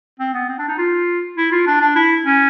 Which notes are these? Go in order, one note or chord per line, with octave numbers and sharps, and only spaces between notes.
C4
B3
C4
D4
D#4
F4
E4
F4
D4
D4
E4
C#4